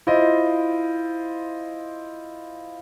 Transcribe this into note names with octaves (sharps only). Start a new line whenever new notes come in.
E4 F4 C5 D#5